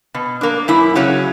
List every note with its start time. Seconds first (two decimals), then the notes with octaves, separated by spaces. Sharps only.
0.15 B2
0.41 A#3 D4
0.68 F#2 E4
0.95 C#3 F#3 C#4